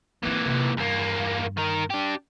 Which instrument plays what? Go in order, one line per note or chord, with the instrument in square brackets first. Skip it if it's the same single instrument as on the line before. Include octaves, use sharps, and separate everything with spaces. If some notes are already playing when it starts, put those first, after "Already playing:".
[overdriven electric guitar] A#2 E3 [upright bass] C4 E4
[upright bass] C3 D#3
[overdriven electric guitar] E2 A#3 [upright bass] G2
[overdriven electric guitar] D#3 A#4
D4 G4